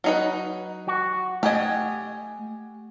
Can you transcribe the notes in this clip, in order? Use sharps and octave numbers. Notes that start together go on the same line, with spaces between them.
F#3 D#4 B4
F#4
A3 G4 D#5 F#5 G#5